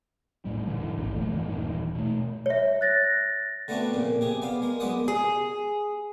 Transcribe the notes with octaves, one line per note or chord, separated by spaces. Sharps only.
D#1 A2 G3
G#2 D3 E3
F1 A#1 A2 D3
G1 F#2 E3 A3
D#1 G2 D#3 E3
B2 A3
C#5 E5
F#6 A6 A#6
D3 A3 B3 C4 D4 F#4
F2 A#2 C#3
C3 G4 G#4
B3 D5 F5
G#3 A#4
F#2 G#3 B3 D5 F#5 D#6
G#4